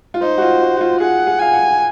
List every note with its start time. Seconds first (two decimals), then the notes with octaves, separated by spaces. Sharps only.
0.14 F4
0.22 D#4 C5
0.38 F#4
0.42 F4
0.62 F#4
0.77 F#4
0.81 F4
1.00 G#4 F#5
1.27 G#4
1.39 F5 G#5
1.53 F#5